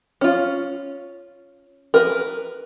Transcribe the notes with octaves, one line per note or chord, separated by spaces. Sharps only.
C#4 F4
A#4 B4